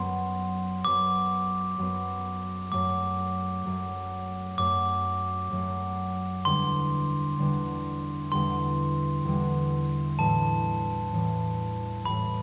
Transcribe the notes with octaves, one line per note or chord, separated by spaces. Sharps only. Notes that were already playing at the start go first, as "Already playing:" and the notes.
Already playing: F#2 F#3 B3 C6
F#2 F#3 B3 D6
F#2 F#3 B3
F#2 F#3 A3 D6
F#2 F#3 A3
F#2 F#3 A3 D6
F#2 F#3 A3
E2 D3 G3 D4 C6
E2 D3 G3 D4
E2 D3 G3 D4 C6
E2 D3 G3 D4
A2 E3 G3 A5
A2 E3 G3
A2 E3 G3 B5